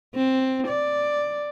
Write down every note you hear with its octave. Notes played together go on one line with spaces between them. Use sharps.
C4
D5